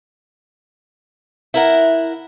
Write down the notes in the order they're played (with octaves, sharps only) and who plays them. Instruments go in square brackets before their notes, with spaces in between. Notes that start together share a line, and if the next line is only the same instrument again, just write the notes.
[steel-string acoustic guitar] E4 A#4 F#5